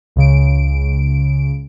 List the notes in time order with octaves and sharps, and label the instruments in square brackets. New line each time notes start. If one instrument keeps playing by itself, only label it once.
[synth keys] C#2 C#3 D7